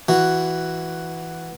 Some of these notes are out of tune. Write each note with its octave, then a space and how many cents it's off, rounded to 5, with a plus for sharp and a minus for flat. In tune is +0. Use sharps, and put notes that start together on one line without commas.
E3 +0 F#4 +0